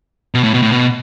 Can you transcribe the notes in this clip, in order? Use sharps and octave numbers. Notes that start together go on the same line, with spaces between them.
B2
A2
B2
A2
B2